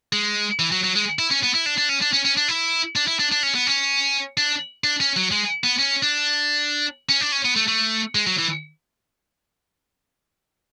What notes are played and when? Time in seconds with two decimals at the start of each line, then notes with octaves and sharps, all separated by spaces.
0.13 G#3
0.59 E3
0.72 F#3
0.84 F#3
0.95 G#3
1.19 E4
1.31 C#4
1.43 B3
1.55 E4
1.66 D4
1.78 D4
1.89 C#4
2.02 D4
2.13 C#4
2.25 C#4
2.37 D4
2.48 E4
2.96 D4
3.08 E4
3.19 D4
3.32 D4
3.43 C#4
3.55 B3
3.67 C#4
4.37 D4
4.84 D4
5.00 C#4
5.16 F#3
5.31 G#3
5.64 B3
5.79 C#4
6.03 D4
7.09 C#4
7.21 D4
7.32 C#4
7.45 B3
7.56 A3
7.68 A3
8.15 G#3
8.27 F#3
8.38 E3